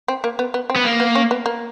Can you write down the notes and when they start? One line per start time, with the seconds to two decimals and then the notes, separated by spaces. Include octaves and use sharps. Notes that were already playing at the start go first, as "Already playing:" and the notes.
0.08 C4
0.24 A#3
0.39 B3
0.54 B3
0.70 C4
0.76 B3
0.85 A#3
1.00 B3
1.15 C#4
1.31 B3
1.46 A#3